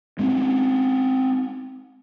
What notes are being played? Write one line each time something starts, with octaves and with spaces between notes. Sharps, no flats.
G#3 C4 C#4